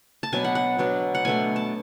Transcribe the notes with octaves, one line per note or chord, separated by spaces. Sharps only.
A5
B2 F#3 B3 D4 G#5
F#5
F#5
B2 F#3 B3 D4
F#5
B2 A3 D4 G#5
A5